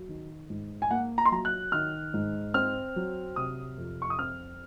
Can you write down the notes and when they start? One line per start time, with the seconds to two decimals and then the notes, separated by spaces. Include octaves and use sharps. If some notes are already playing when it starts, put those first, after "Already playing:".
Already playing: F#3
0.09 D#3
0.50 G#2
0.82 G#5
0.90 A#3 F#5
1.18 A#5
1.25 C6
1.32 F#3 A#5
1.45 F#6
1.72 D#3 F6
2.14 G#2
2.54 C4 F6
2.96 F#3
3.36 C3 D#6
3.78 F2
4.02 C#6
4.10 D#6
4.19 C4 F6